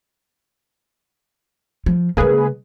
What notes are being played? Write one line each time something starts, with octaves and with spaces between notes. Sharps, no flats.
F3
C#3 G#3 A#3 G#4 B4